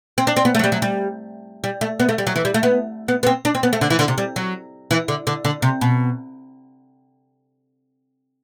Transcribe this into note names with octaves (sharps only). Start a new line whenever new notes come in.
C4
D4
C4
B3
A3
F#3
G3
F#3
G3
G3
A3
B3
A3
G3
F#3
E3
G3
A3
B3
B3
B3
C4
D4
C4
B3
A3
D3
E3
D3
C3
G3
F#3
E3
D3
D3
D3
C3
B2